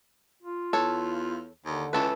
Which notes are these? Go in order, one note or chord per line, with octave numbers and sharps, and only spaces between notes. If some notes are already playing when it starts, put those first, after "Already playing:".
F4
E2 A4 C#5
D#2 D3
C#2 E3 A4 B4